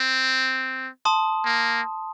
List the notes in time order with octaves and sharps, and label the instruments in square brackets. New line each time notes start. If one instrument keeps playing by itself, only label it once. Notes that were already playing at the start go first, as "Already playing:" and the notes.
Already playing: [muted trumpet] C4
[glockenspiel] A5 C6 D#6
[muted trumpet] A#3